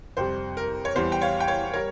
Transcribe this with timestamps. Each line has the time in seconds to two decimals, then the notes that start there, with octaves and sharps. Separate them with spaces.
0.17 F2 C3 G3 C5
0.57 A#4
0.85 C#5
0.96 E2 E3 G3 C5
1.12 G5
1.22 C#5 F5
1.40 G5
1.47 C#5 F5
1.73 G3 A#4 C#5